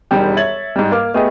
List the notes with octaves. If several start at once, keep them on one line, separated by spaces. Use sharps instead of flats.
E1 D#3 G3 G4
C#5 E5 G#6 A6 F#7
G#2 G3
A#3 F5 D6 F6
A3 B3 G4 G#4 D#5